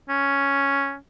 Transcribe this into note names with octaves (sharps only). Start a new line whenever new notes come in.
C#4